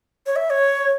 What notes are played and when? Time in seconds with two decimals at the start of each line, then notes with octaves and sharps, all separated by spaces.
0.26 C#5
0.36 E5
0.50 C#5